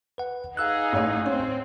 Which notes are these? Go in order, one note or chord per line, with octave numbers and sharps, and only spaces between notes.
B4 F#5
D#4 G#4 F5 E6 F#6
A1 C#5
C4 C#4